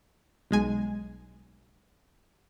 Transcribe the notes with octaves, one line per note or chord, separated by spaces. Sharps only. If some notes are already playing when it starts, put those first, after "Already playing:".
B1 G#3 G#5